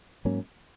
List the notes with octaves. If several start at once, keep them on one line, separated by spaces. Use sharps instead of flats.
G#2 F#3 A#3 C#4